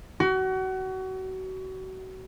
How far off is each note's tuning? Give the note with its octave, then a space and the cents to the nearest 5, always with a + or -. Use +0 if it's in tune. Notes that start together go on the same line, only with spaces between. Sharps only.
F#4 +30